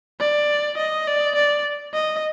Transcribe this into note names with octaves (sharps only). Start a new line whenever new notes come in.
D5
D#5
D5
D5
D#5